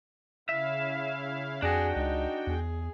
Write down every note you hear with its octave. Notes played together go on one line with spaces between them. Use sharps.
C#3 E4 E5 F5
F2 D4 F#4 G#4 G5
C#2 D#4
E2 G#4